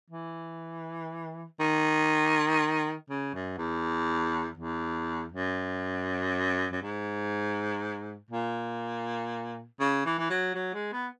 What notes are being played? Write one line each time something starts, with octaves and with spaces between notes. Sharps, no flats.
E3
D#3
C#3
F#2
E2
E2
F#2
F#2
G#2
A#2
C#3
E3
E3
F#3
F#3
G#3
B3